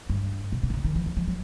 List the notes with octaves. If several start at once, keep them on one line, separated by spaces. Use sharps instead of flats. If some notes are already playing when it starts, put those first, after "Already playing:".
G2
B2
C3
D3
C#3
D#3
E3
F3
F3
F#3